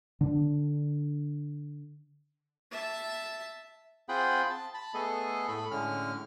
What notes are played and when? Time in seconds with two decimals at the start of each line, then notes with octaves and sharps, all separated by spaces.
0.21 D3 D4
2.71 E5 A5
4.09 C4 F4 G#4 F#5 G5 B5
4.50 A5
4.74 A5 B5
4.94 A3 B3 G#4 A4 D#5
5.48 A2 A3 B5
5.71 A2 D3 G#3 C#4 F6